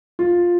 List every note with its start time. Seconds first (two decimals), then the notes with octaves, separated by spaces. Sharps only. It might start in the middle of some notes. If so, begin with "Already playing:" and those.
0.19 F4